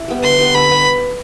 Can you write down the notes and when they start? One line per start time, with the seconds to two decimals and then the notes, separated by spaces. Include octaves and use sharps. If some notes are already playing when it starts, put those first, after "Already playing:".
Already playing: E4
0.08 G3 B3
0.23 D3 C6
0.38 G3 B3
0.54 D3 B5
0.70 G3 B3